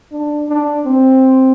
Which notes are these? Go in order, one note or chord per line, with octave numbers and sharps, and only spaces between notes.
D4
D4
C4